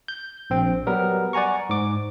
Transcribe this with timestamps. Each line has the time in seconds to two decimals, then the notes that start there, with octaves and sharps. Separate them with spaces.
0.08 G6
0.50 A#1 C4 G5
0.86 F#3 G3 B3 A#4
1.33 D5 F#5 G#5 A#5 C#6
1.69 G#2 D6